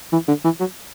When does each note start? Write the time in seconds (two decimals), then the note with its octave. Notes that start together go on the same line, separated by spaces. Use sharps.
0.13 E3
0.28 D3
0.44 E3
0.60 F#3